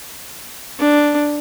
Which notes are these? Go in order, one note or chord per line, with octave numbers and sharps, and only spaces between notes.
D4